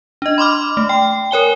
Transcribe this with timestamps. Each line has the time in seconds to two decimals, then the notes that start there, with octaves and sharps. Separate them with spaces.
0.22 D4 D#5
0.38 B5 C6 D6 F6
0.77 A3
0.89 G5
1.31 A#4 C#5 G#5 G7